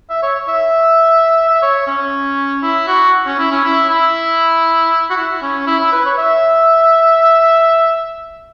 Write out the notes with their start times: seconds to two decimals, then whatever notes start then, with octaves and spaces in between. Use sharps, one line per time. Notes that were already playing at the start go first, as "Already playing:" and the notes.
0.10 E5
0.22 C#5
0.48 E5
1.50 E5
1.62 C#5
1.87 C#4
2.63 E4
2.88 F#4
3.26 C#4
3.39 E4
3.51 C#4
3.64 E4
3.89 E4
5.10 F#4
5.17 E4
5.42 C#4
5.67 E4
5.80 E4
5.92 B4
6.05 C#5
6.18 E5